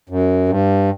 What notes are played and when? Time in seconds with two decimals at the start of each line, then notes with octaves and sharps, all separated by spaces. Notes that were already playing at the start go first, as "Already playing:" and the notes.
0.09 F#2
0.49 G2